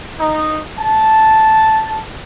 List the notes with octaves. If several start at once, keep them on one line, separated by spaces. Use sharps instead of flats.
D#4
A5